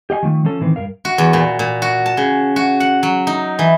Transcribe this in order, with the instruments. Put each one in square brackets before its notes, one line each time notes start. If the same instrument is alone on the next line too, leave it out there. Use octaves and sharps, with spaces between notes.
[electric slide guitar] G4 D#5 F5 G#5
D#3 F3 A3
F3 C#4 A4
A2 D#3 E3 C4
G2 B2 A#4 F5
[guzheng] F#4
E2
A#2
A#2
F#4
A5
C#3
F#4
F#5
F#3
D#4
E3